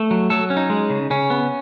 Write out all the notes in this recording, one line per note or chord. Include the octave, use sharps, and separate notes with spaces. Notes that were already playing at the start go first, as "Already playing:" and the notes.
Already playing: A3 A4
F#3
F#3 A4
C#4
D#4
G#3
C#3
C#3 C#4
B3